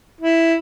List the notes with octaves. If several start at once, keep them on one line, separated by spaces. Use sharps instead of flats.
E4